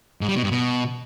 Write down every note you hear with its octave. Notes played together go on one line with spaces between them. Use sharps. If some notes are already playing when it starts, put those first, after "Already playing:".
G#2
G3
B2
G2
B2